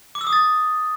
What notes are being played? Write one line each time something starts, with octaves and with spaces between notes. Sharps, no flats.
D6
E6
D#6
A6